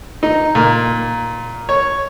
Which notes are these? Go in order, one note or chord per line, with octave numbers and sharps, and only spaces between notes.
D#4
A#2
C#5